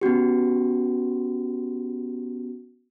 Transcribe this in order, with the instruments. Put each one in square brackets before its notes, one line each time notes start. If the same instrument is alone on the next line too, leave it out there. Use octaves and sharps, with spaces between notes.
[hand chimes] B3 C#4 F#4 G4